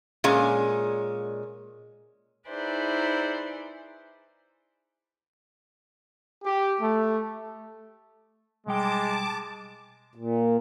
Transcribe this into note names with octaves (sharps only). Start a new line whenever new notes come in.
A#2 G#3 C#4
D#4 E4 G#4 B4 C5 D5
G4
A3
B1 G3 G#3 G5 A5 D6
A#2